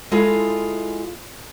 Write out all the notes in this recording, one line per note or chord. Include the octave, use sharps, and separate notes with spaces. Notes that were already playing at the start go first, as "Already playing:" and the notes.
G#3 E4 F4 G#4 A4